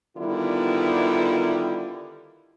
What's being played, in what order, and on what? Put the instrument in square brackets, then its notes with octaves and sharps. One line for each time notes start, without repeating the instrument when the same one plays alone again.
[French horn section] D3 D#3 G3 B3 E4 F4